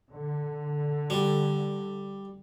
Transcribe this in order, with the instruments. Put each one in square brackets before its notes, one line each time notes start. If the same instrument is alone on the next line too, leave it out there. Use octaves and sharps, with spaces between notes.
[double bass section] D3
[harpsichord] G3